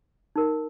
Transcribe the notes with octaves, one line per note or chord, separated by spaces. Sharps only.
D#4 A#4